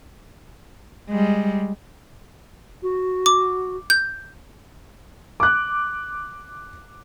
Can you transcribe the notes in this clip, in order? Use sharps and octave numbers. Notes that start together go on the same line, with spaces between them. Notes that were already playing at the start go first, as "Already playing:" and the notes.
G3 G#3
F#4
D6
G6
D6 F#6